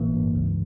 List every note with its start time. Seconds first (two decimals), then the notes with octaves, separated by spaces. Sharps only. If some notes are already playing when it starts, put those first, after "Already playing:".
Already playing: G1 A2 E3 A#3
0.14 G2
0.35 C#2